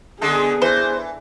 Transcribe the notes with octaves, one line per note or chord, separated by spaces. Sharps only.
D3 G#3 B3 G#4 A4
E3 C5